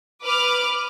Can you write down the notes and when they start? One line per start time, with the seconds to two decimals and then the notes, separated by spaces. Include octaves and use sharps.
0.23 B4 D6 F6